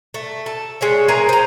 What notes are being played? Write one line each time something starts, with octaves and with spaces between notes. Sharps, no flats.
A3
A4
G#3 C#5 E5
G#4 A#4 B4 A#5
C5 A#5